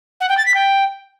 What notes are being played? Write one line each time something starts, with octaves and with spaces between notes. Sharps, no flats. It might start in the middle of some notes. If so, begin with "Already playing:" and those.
F#5
G5
A6
B6
G5